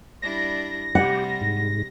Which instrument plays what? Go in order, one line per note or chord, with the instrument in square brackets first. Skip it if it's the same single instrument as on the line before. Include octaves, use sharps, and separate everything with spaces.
[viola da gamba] G3 D4 E4 [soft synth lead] A#6
[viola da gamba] C3 G3 [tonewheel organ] G4 [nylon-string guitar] F#5
[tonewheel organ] G#2